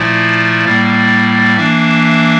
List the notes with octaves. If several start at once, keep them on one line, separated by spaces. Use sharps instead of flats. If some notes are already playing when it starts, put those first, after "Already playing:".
Already playing: A#2 F3 A3 E4 D5
A2 G3 A#3
E3 A#3 D4 E5
E5